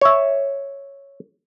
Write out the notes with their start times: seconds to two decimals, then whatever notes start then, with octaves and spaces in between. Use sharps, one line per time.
0.01 C#5 E5